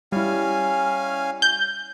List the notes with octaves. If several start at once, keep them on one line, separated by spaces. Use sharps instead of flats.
G3 C#4 E4 F5 G#5
G6